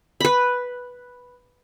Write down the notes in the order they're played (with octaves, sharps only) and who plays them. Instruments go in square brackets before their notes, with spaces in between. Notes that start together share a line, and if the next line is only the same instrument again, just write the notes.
[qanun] B4 B5